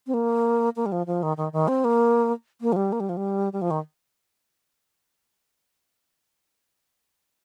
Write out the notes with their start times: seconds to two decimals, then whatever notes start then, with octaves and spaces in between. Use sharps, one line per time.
0.07 C4
0.14 A#3
0.76 A#3
0.86 G3
0.92 F3
1.07 F3
1.23 D#3
1.37 D#3
1.53 D#3
1.68 C4
1.85 A#3
2.61 A#3
2.73 F3
2.76 G3
2.92 A#3
3.00 G3
3.09 F3
3.17 G3
3.53 G3
3.62 F3
3.71 D#3